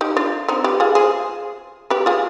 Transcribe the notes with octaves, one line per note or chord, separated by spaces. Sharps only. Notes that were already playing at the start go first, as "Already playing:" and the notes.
D#4 G4
D4 F4
C4 D#4
G4 B4
F4 G#4
G#4 C5
G4 B4
F4 G#4